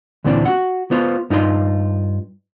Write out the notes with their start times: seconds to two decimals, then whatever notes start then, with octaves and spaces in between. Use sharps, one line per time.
0.24 D2 A#2 E3 C4 D4
0.45 F#4 F#5
0.91 B3 F4 C5
1.30 G2 D#4 F4 A#4 C6